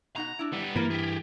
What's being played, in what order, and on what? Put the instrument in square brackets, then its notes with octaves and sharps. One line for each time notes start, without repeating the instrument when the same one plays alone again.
[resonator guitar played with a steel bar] B2 D#4 F#5 [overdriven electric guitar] A#5
[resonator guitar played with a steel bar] D4 E4
[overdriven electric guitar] G3 B3
[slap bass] G2 E3 [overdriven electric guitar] A#3 [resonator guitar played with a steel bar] A#4 B4
[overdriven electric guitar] G4 G#4